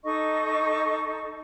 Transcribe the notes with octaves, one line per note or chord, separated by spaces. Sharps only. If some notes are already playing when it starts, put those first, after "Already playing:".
D#4 A4 D#5 C#6